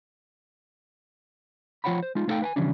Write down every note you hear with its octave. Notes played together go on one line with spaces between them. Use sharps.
F3 F4 C#5 F#5 G5 B5
C5
G#3 D#4 F4
A3 B3 D#4 A4 F5 G5
B4 G5 G#5
C#3 E3 F3 G3 C#4 D4